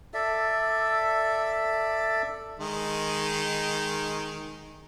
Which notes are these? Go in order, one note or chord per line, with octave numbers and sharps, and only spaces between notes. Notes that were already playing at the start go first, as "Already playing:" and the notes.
A4 D5 E5
D#3 G#3